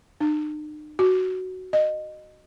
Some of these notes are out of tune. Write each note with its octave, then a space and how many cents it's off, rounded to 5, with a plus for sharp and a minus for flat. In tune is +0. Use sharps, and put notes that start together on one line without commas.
D#4 -45
F#4 +5
D#5 -20